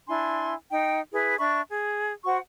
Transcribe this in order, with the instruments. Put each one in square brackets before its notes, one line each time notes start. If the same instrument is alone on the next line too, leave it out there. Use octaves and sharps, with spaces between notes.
[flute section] D4 E4 G#5 C6
D#4 G5
E4 G#4 B4
D4 E5 B5 C#6
G#4
F#4 C5 F#5 C#6